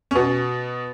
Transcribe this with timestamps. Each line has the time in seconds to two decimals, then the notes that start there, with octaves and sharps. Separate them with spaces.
0.11 C#4
0.15 B2 B3